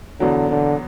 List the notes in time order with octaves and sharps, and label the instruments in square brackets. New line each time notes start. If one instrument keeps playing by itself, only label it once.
[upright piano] E2 B2 F#3 [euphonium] D3
[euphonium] D3